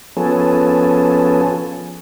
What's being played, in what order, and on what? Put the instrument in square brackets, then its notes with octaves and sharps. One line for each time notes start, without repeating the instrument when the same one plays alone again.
[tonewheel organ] F3 B3 C#4 G#4 A4